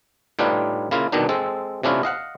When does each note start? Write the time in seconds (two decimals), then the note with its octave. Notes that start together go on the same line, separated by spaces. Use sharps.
0.39 A2 G3 D4 D#4 F4 B4
0.91 C#3 A#3 E4 F4
1.12 C2 B2 D#3 D4 D#4
1.29 G#3 C4 A4
1.83 C3 A3 C#4 D4 E4 F4
2.03 D#5 F5 F#5